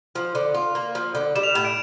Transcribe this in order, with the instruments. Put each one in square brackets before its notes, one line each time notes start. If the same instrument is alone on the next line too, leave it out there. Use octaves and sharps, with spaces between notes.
[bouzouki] F3
D3
F4
A#3
F3
D3
[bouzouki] G3 [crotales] E7
[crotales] F7
E7
[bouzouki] A2
[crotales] D7